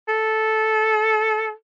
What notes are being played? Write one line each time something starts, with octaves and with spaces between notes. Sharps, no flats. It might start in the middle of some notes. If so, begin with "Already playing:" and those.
A4